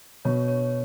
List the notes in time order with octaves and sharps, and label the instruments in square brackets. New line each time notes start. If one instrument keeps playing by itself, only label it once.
[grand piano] B2 [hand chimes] C#5
[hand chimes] C#5